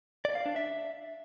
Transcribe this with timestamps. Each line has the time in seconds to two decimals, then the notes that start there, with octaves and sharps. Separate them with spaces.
0.25 D5
0.35 F5
0.46 D4
0.56 E5